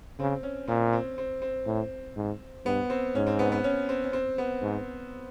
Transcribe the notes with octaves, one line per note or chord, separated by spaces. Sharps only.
C#3 C4
C#4
A#2 C4
C4
C4
C4
A2
G#2
G2 B3
C4
G#2 C#4
C4
B3
B3
C#4
C4
C#4
C4
B3
G#2